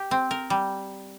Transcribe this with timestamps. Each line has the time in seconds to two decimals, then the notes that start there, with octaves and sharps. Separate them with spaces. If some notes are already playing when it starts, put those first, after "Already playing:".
Already playing: G4
0.11 C4
0.31 A#4
0.50 G3